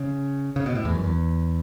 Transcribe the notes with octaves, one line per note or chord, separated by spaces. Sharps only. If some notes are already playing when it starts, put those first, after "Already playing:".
Already playing: C#3
C#3
B2
A2
E2
F#2
E2